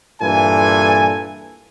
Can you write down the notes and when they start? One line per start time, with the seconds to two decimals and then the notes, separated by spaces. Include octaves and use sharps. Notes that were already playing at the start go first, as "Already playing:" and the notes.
0.22 G2 A#2 E3 A4 G#5